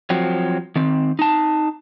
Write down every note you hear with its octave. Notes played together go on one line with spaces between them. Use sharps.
F3 F#3 C4
D#3 C4
D#4 A5